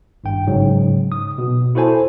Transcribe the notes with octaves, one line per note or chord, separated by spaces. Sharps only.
G#1 G2 G5
G#2 C#3 F#3
D#6
B2
E4 F#4 A4 C5 G#5 A5